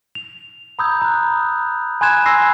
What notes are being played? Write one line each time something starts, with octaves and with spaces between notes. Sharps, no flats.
F7
A#5 B5 D#6 E6 G6 G#6
A#5 F#6
G#5 B5 C6 F#6 G#6 E7
B5 C6 E6 A#6 C7